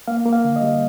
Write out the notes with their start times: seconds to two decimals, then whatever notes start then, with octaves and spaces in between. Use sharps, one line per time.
0.08 A#3 F5
0.26 A#3
0.32 F5
0.45 D3
0.56 D#5
0.62 G3